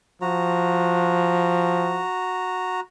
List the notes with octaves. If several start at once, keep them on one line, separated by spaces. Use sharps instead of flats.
F3 F#4 A#5